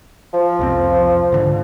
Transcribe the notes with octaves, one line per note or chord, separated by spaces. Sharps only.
F3
C2 F2 C4
G#2 D3